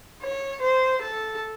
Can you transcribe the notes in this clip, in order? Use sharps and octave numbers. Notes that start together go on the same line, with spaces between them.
C#5
C5
A4